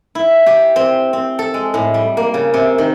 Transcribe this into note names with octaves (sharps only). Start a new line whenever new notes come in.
E4
G4
C4
C4
A4
G#3
A2
G3
A#3
C#3
C3
D#3